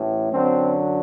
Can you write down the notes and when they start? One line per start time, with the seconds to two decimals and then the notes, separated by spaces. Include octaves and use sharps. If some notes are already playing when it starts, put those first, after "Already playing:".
Already playing: A1 A2 E3
0.30 F#2 D3 F#3 C4